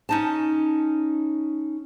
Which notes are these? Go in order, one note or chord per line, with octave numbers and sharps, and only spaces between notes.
C#4 D#4 A5